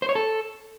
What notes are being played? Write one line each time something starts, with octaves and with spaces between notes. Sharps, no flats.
C5
C#5
A4